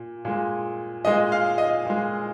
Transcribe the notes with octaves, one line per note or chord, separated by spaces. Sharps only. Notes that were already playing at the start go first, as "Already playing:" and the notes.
Already playing: A#2
A#2 G#3
A#2 G#3 D#5
F5
D#5
A#2 G#3